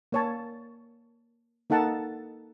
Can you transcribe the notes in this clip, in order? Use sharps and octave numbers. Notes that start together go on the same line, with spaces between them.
A#3 C#5 A5
A#3 D#4 A4 F#5 A5